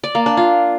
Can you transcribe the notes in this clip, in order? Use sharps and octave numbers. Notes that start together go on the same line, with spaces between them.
D5
A#3
D4
F4